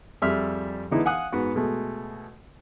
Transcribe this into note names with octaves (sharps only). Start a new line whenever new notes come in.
F2 G3 G#4 E5 C6 F6
D3 E3 G#3 B3 D#4 E4
F5 F#5 G#5 D#6 F#6
G#2 B3 F#4
B2 G#3 A3